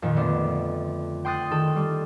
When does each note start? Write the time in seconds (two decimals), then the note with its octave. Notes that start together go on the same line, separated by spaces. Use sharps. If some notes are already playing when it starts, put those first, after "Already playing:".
0.02 F2 A#2 D#3
0.16 D3 A3 B3 D4
1.25 G5 C6 D#6 F#6 A6
1.50 D#3 A4
1.76 G3